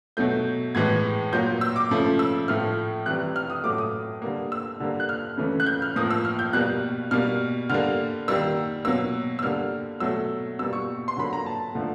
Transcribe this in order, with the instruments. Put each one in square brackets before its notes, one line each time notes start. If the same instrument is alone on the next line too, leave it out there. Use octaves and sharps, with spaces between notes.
[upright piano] B2 F#3 A3 G6
A2 E3 G#3 G#6
A#2 F#3 A#3 G6
E6
D6
C#3 F3 A3
E6
A2 F3 A3 F6
C3 E3 G3 F#6
F6
D#6
A2 F#3 A3 D6
D#6
D3 G3 A#3
E6
D3 G3 A#3
F#6
F6
C#3 E3 A3
F#6
G6
F6
A2 F3 A#3 D#6
E6
F6
G6
B2 G3 A#3 F#6
B2 G3 A#3 F6
D3 G3 A#3 F6
D#3 G3 A#3 E6
B2 F#3 A#3 E6
E6
D3 G3 A#3 F6
B2 F#3 A3 E6
B2 G3 A#3 E6
C#6
C6
D3 F#3 A#3 B5
A#5
A5
D3 F3 A3